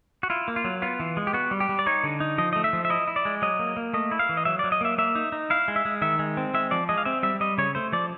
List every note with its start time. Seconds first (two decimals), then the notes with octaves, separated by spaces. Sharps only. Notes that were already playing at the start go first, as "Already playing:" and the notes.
0.23 F#4
0.30 E4 F4
0.48 A#3
0.56 F4
0.64 F#3
0.82 B3 F4
1.00 E3
1.17 G#3
1.27 G4
1.33 B3 F#4
1.51 G3
1.60 G4
1.69 G3
1.79 D5
1.86 D#4 C#5
2.04 D3
2.20 D#4
2.38 F3 D#5
2.53 A3 D#5
2.64 E5
2.73 F3
2.85 E5
2.90 E4 D#5
3.07 E4
3.16 D5
3.25 G#3
3.42 F#3 D#5
3.59 A#3
3.77 A#3
3.93 A3 D#5
4.11 E4
4.19 F5
4.29 E3
4.37 D#5
4.45 F#3 E5
4.59 D5
4.64 F#3
4.72 D#5
4.81 A#3 E5
4.98 A#3 E5
5.15 D#4
5.32 D#4
5.50 E4 F5
5.68 G#3
5.76 E5
5.85 G#3
6.02 D#3 E5
6.19 G#3
6.37 C4
6.54 G#3 E5
6.71 F3 D5
6.89 G#3 D#5
6.98 F5
7.05 C4 E5
7.23 G3 E5
7.41 G3 D#5
7.58 C#3 C#5
7.75 A3 C5
7.92 F3 D5